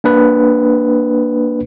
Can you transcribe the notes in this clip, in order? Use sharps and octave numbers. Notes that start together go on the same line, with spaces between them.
A#3 D4 B4